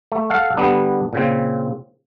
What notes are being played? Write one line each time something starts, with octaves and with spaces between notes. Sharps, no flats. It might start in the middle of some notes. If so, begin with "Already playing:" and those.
A3
A4 F5 F#5
D3 G3 B3 D4
A#2 C#3 C4